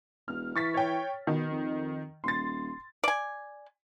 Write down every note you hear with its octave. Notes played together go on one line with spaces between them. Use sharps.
E1 F6
E3 C#6 A6 B6
C#5 G5
B2 D#3
F2
D#1 C6 A6
D5 G#5